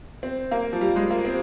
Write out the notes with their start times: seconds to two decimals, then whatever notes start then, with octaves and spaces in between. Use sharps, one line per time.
0.23 C4
0.51 A#3
0.73 F3
0.81 G3
0.96 G#3
1.10 A#3
1.25 C4